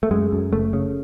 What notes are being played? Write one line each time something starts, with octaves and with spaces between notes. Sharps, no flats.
A3
F#2 G#3
F#2
F#1 A3
C#3